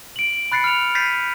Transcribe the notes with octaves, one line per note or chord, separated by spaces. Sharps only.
D7 F#7
B5 F#6 A6 C7 C#7
F6 F7
G6 A6 B6 C7 D#7